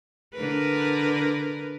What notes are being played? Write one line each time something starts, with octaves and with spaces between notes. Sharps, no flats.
D3 A#4 B4